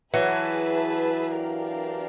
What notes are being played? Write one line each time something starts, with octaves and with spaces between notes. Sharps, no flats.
E3 F#3 G#4 B4 E5 A5
D4 G4 A#4 D5 F5